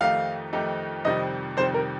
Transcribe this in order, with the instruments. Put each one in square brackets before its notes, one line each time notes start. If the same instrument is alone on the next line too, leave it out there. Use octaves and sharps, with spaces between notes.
[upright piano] F2 D#3 A3 D#4 G4 [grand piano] F5
[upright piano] F2 D#3 A3 D#4 G4
[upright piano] F2 C3 D#3 G3 [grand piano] D#5
[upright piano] F2 C3 D#3 G3 [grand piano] C5
[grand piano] A#4